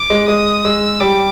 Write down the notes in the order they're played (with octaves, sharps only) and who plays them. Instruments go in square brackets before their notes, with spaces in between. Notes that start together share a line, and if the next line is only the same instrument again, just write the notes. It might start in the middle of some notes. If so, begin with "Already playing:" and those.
Already playing: [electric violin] D6
[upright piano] G#3
[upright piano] G#3 [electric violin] D#6
[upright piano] G#3 [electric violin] E6
[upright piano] G3 [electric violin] D6